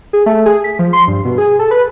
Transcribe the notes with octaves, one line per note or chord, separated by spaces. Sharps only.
G#4
A3
G#4
B6
F3
C6
G2
B2
G#4
A4
B4